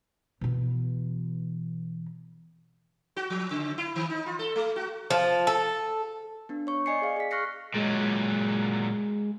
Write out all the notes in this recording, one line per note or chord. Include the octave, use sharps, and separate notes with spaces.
B2 E3
F#4
F3
C#3
E4
D#3
D#4
F4
A4
A3
F#4
F3
A4
B3 D4
C#5 C#6
D5 D#5 G#5 C7 C#7
G#4 F5
G#4 B6
C#6 F6 F#6 A#6 C7 C#7
A#2 F#3 G#3